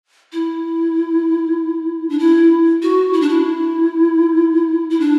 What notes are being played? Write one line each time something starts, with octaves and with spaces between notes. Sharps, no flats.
E4
D4
E4
F#4
E4
D4
E4
E4
D4